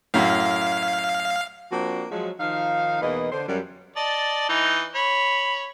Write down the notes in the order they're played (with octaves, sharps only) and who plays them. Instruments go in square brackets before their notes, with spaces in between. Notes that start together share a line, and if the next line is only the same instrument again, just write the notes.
[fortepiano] F#2 A2 [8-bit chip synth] F5
[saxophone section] F3 A#3 C4 D4 F#4
F3 F#3 G#3
D#3 F3 D#4 F5
E2 B2 A#3 D#4 B4 D#5
D3 C5
F#2 G3
[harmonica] D5 D#5 A5
E3 D#4 D#5
C#5 B5